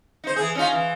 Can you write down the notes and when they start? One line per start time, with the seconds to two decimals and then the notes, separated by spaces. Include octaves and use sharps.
0.24 D#4 C5
0.36 E3 G#4
0.55 C#4 D#4 F4
0.73 E3